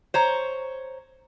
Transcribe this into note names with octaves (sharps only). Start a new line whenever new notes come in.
C5 C#5 A#5